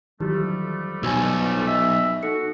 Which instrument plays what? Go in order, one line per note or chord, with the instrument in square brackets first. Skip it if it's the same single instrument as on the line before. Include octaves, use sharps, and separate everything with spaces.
[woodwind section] F2 G3 A3 [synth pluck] D#3 E3 F#3 [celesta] G4
[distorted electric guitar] B1 [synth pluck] F#3 [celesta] G#5 E6
[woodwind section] D#5 E5 [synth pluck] B6
[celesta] D#4 A4 C#7 [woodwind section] F#4